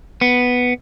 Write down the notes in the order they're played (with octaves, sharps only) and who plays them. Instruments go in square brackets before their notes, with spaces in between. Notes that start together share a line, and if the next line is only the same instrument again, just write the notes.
[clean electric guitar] B3